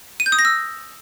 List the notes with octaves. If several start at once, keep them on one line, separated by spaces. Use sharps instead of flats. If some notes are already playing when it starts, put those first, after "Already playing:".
D#7
G6
D#6
A#6
E6